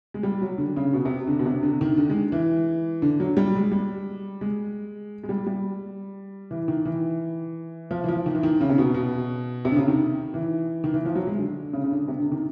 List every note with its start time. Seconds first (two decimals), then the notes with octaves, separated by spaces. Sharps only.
0.14 G#3
0.23 G3
0.42 F#3
0.58 D3
0.76 C#3
0.93 B2
1.05 C3
1.28 D3
1.39 B2
1.46 C3
1.63 D3
1.81 D#3
1.97 D3
2.10 G#3
2.32 E3
3.02 D3
3.20 F#3
3.37 G3
3.55 G#3
3.72 G3
4.41 G#3
5.23 G#3
5.29 G3
5.47 G3
6.51 E3
6.68 D#3
6.85 E3
7.91 F3
8.04 E3
8.08 F3
8.26 D#3
8.35 E3
8.43 D#3
8.61 C#3
8.69 C3
8.78 B2
8.94 B2
9.65 C3
9.72 D3
9.76 C#3
9.88 D#3
10.34 E3
10.84 D#3
10.94 E3
11.05 F3
11.15 F#3
11.27 G#3
11.39 D3
11.73 C#3
11.84 C#3
11.91 D3
12.08 C3
12.20 D3
12.32 D#3